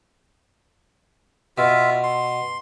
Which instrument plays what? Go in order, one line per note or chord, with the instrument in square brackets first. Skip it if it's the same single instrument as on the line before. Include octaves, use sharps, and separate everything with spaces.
[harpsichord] B2 [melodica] F4 E5
[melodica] C6